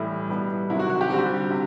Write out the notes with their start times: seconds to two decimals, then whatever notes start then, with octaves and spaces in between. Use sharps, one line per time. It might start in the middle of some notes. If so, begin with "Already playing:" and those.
Already playing: A2 E3 G3 E4
0.30 B2 G3 B3
0.70 C3 D#3 F#3 E4
0.79 F#4
0.90 F#4
1.01 G4
1.10 D3 G3 C4 F#4
1.19 G4
1.51 C3